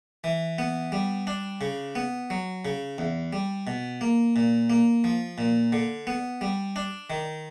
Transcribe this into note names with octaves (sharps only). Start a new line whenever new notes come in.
E3
B3
G3
D4
C#3
B3
F#3
C#3
E2
G3
B2
A#3
A#2
A#3
F3
A#2
D3
B3
G3
D4
D#3